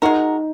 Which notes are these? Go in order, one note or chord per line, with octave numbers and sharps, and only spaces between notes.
G#3 D#4 F#4 A#4